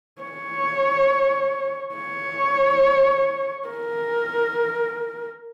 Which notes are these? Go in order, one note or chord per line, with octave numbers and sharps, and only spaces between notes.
C#5
C#5
A#4